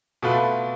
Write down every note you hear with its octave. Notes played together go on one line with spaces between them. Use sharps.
B2 A3 F4 B4